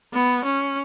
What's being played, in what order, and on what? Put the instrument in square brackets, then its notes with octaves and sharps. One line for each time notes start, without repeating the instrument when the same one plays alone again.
[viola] B3
C#4